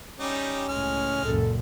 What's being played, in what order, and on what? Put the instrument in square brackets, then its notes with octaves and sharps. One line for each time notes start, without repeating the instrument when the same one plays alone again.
[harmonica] G3 D#4 G4 [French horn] C#4
[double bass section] C#2 A2 [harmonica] G#3 F6
[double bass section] C#2 F#2 A#2 [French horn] A4